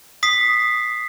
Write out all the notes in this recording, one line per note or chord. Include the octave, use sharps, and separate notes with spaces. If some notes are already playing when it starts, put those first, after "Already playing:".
D#6 B6 C7